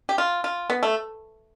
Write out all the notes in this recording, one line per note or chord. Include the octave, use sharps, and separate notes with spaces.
G4
F4
F4
B3
A3